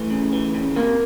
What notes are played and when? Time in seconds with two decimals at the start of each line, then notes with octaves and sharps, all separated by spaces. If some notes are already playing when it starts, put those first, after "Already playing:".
Already playing: E3 A3
0.10 C#3
0.33 E3
0.54 C#3
0.76 C3 A#3